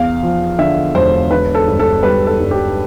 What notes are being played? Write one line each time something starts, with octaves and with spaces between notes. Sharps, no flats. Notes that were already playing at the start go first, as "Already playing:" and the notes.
Already playing: E2 F5
F3
D3 E5
E1 C5
D3 B4
A4
G2
A4
G3 B4
A4
G2
G4